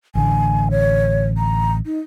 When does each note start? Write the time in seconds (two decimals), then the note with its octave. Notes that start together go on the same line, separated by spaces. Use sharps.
0.15 A1 D3 G#5
0.71 C#5
1.38 A#5
1.86 D#4